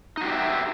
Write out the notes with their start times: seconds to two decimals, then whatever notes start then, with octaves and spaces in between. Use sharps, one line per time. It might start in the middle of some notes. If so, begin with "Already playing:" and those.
0.17 D#4
0.21 F#4
0.24 G4
0.28 D5
0.32 E5